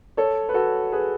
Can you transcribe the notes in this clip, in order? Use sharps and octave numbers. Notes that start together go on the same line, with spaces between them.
A4 C#5
B4
F#4 A4
G#4 B4